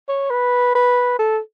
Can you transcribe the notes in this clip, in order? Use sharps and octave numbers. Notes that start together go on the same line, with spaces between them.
C#5
B4
B4
A4